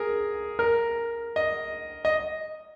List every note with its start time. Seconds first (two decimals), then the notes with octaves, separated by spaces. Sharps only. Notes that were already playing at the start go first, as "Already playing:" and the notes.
Already playing: G#4 A#4
0.59 A#4
1.36 D#5
2.05 D#5